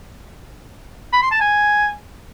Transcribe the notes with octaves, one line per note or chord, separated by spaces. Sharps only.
B5
C6
A5
G#5